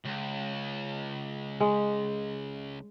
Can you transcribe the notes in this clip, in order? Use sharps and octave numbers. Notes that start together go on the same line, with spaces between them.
C#2
G#3